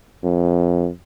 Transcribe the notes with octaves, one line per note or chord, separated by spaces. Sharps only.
F2